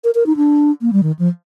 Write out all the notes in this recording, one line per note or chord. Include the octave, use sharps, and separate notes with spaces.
A#4
A#4
D#4
D4
A#3
G3
D#3
F3